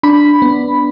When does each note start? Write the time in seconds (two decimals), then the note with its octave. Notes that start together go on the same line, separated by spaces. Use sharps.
0.03 D4 B5
0.42 B3